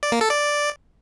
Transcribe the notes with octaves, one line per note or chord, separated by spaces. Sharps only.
D5
A#3
A4
D5